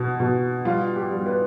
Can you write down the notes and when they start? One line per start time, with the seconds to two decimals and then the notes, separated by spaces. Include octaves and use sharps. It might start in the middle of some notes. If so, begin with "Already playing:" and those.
Already playing: B2
0.20 B2
0.65 G3 F4
0.96 G4
1.11 G3
1.26 B4